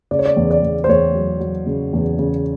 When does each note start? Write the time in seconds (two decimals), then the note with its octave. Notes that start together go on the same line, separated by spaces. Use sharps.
0.11 C#3 D5
0.19 C#5
0.25 D5
0.37 E2
0.51 D5
0.63 E2
0.84 C5
0.89 E2 C#5
1.15 F#3
1.40 F#3
1.66 C#3
1.93 E2
2.19 C#3